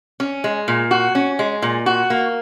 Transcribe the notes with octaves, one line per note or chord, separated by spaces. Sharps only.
C#4
G#3
A#2
F#4
C#4
G#3
A#2
F#4
A#3